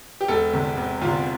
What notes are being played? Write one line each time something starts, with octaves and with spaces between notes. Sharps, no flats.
G4
E1 A4
E2 C3
E1
E2 C3 F4